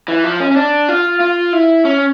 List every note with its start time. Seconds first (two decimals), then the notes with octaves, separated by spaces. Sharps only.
0.08 E3
0.24 F3
0.40 C#4
0.51 C#4
0.57 D4
0.88 F4
1.20 F4
1.53 E4
1.85 C#4